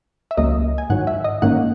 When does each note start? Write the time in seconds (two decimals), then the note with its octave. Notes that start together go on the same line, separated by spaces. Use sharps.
0.31 E5
0.37 C#2 C#3 F#3 A#3 D#5
0.78 G#5
0.90 G#2 D#3 F#3 F#5
1.07 E5
1.24 D#5
1.42 G#2 D#3 A#3 C#4 F#5